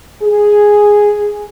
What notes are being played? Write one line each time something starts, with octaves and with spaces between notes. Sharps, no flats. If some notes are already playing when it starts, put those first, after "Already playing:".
G#4